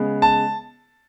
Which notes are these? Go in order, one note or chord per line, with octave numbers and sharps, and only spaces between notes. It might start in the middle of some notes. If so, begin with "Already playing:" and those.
Already playing: C#3 G#3 B3
A5